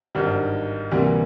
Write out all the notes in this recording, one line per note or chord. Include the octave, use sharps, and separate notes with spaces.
G#1 G2 D#3 G3
D2 C3 E3 G3 A#3